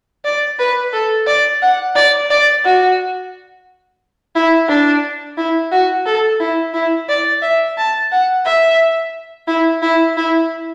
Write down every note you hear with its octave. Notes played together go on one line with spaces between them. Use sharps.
D5
B4
A4
D5
F#5
D5
D5
F#4
E4
D4
E4
F#4
A4
E4
E4
D5
E5
A5
F#5
E5
E4
E4
E4